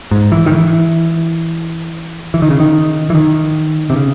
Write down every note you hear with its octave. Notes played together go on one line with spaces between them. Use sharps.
G#2
E3
D#3
E3
E3
D#3
C#3
D#3
E3
D#3
C3
C#3